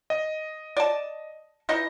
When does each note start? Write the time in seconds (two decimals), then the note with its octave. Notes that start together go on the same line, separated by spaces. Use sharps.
0.10 D#5
0.77 D5 A5
1.69 E3 D#4 D#5